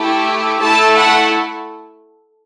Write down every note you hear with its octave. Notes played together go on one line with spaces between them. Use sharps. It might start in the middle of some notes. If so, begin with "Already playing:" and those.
Already playing: A3 E4 G4
A3 E4 A4 A5
F#5